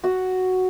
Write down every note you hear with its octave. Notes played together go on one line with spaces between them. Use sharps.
F#4 F#5